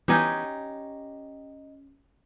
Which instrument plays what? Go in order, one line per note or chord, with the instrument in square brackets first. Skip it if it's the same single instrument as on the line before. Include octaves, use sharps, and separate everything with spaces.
[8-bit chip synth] E3 B3 G#5 [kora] C#4 D#4 G4